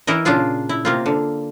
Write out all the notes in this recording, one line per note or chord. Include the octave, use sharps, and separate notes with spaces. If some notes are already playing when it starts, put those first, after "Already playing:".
E3 E4 A#4 D#5
A#2 C#3 D4 F4 G#4
E4
C3 A#3 F4
D3